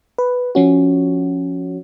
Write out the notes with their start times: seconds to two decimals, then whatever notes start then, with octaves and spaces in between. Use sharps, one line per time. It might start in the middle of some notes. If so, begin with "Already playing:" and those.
0.18 B4
0.55 F3 C#4 F#4